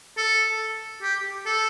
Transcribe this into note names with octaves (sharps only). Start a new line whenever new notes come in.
A4
G4
A4